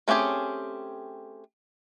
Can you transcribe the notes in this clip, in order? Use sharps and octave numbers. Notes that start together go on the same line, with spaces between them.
A3 C4 C#4 G4 G#4